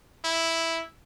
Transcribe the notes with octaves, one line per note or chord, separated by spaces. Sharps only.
E4